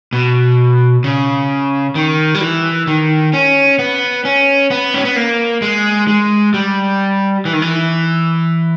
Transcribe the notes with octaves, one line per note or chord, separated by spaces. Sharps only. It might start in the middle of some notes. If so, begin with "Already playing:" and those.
B2
C#3
D#3
G3
E3
D#3
C#4
B3
C#4
B3
C#4
B3
A#3
G#3
G#3
G3
E3
D#3
E3